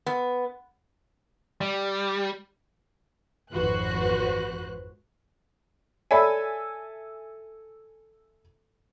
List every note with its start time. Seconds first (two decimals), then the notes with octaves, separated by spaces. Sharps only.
0.06 B3
1.61 G3
3.53 G#1 F2 F#4 B4 C5 F#6
6.11 A4 C#5 D5 E5 G#5 B5